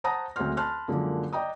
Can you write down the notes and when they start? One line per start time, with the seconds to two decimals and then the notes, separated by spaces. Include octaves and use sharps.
0.04 C5 F#5 A5 A#5 D#6 A#6
0.36 D2 G#3 C4 F#5 C6 F6
0.57 A5 B5 C6 F6 F#6
0.88 F#2 D3 F3 G#3 A#3
1.33 D5 D#5 G5 A#5 D#6